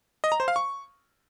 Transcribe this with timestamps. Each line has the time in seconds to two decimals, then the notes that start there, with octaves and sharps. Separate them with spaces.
0.24 D#5
0.32 A#5
0.40 C5
0.48 F5
0.56 C#6